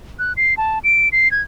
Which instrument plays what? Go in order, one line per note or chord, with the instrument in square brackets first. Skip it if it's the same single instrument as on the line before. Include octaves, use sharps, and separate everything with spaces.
[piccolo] F#6
C7
A5
D7
C7
G#6